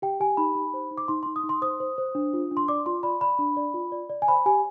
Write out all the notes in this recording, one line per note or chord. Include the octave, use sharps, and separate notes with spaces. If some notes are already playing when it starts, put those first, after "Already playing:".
G4 G5
G4 G#5
D#4 B5
D#4
C5
D#4
D6
D#4 C6
D#4 C6
D#6
D#4
C6
C5 D#6
C5
C5
D4
F4
D4
C6
D5 D6
F4 C6
D5 B5
D5 B5
D4
D5
F4
D5
D5
G#5
C5 B5
G4 G#5